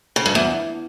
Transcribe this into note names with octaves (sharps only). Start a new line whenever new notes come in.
C#3
G2
E2